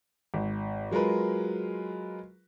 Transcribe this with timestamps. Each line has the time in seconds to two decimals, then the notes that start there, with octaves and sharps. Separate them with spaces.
0.34 G#1
0.91 F#3 G#3 F4 A#4 B4